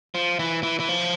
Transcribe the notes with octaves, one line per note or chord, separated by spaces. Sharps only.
F3
E3
E3
E3
F3